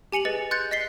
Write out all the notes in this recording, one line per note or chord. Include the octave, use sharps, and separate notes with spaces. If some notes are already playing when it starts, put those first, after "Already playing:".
G4 G#5 C#7 F7 F#7
G#4 B4 D#5 A6 C#7
C6 F#6 G6 A6 C#7
D#5 A6 B6 C7 G7